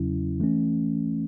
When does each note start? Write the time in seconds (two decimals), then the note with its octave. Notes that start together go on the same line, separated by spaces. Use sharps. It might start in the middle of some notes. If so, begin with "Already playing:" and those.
Already playing: E2 C#3 F#3 C#4 E4
0.40 E3 A3 C#4